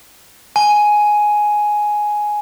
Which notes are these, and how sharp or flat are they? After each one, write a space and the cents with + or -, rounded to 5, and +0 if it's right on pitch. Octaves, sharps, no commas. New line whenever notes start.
G#5 +5